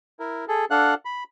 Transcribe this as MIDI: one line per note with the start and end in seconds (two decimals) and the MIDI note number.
0.20 0.45 64
0.20 0.45 70
0.48 0.65 68
0.48 0.65 69
0.71 0.94 62
0.71 0.94 69
0.71 0.94 77
0.71 0.94 78
0.71 0.94 90
1.05 1.24 83